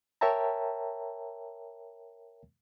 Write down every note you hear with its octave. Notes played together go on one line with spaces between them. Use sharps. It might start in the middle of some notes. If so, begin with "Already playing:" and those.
A#4 C#5 E5 G5 A5 A#5